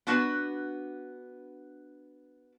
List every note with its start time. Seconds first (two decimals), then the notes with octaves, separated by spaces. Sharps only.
0.07 B3 D4 F#4 B4 A5